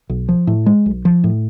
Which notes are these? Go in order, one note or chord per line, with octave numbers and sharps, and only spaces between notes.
B1
F3
A2
G#3
B1
F3
A2